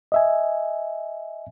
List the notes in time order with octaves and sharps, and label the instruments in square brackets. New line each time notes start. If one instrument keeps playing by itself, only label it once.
[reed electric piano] D#5 E5 G#5